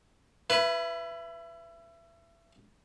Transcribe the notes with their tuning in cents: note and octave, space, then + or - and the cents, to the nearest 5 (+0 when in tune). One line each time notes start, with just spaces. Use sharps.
E4 +30 B4 +0